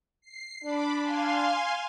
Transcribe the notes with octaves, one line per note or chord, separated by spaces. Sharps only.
C7
D4 B5 D6
F5 G#5 C6